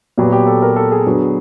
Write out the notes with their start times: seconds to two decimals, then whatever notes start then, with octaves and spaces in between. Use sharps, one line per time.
0.18 A#2 F#3 B3 G4
0.32 G4
0.47 A4
0.62 A#4
0.76 A4
0.92 G#4
1.06 D3 F#3 B3